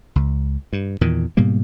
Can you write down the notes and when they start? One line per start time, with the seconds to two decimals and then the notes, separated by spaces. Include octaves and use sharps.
0.16 C#2
0.73 G2
1.01 E2 A#2 D#3
1.37 G#2 B2 G3 A#3